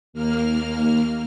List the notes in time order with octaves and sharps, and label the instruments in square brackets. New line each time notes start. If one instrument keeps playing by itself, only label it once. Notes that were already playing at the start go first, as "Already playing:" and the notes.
[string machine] D#2 A#3 F6